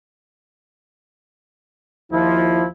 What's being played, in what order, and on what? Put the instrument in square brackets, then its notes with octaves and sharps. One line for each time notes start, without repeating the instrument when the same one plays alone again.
[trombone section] D#2 F3 [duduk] E4